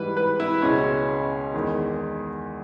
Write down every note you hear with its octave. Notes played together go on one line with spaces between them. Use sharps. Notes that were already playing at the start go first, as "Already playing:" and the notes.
Already playing: G#2 E3 G3 B4
B4
E4
C#2 B2 G#3 C#4
E2 D#3 G#3